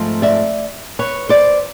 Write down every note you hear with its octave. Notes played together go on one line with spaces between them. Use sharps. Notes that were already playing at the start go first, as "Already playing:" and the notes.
Already playing: G#2 F3 A3 C4
D5 E5
B4 C#5
C5 D5